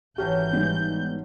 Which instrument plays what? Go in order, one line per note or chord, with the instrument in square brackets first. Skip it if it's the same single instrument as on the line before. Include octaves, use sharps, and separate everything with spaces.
[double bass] G#1 E3 [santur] F#3 A3 C#4 [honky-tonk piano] G4 [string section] G6
[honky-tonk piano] G#2 G3 B3